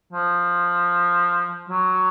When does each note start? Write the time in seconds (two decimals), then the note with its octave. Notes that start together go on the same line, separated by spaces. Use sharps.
0.13 F3
1.70 F#3